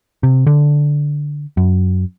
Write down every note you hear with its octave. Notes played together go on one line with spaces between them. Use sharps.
C3
D3
F#2